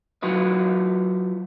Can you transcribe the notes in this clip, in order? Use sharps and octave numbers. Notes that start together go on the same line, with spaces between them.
F#3 F4 B4 D#5